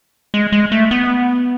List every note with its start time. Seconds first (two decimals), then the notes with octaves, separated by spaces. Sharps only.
0.34 G#3
0.52 G#3
0.72 A3
0.91 B3